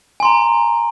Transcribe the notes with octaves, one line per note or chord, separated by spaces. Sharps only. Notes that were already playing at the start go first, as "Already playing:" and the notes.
G#5 A#5 C6